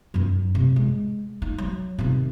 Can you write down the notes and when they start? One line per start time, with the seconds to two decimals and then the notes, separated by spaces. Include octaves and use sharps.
0.14 F#2 D#4
0.55 C3
0.76 G#3
1.42 D#4
1.58 F#3
1.98 C3 D#3